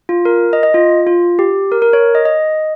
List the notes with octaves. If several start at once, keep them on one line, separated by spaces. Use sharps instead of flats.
F4
A#4
D#5
D#5
F4
F4
G4
A#4
A#4
C#5
D#5
D#5